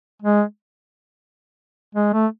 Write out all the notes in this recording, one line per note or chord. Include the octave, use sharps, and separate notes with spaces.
G#3
G#3
A3